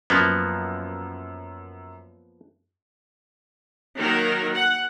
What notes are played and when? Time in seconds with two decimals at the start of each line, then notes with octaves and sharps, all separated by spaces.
0.10 F#2 F3 A#3 B3
3.98 D#3 F#3 A#3 A#4
4.55 F#5